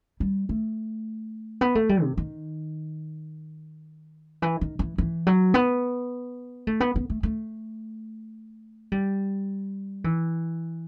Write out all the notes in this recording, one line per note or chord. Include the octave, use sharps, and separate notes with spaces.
G3
A3
B3
A3
G3
C3
D#3
E3
D#3
E3
E3
F#3
B3
A3
B3
B3
A3
A3
G3
E3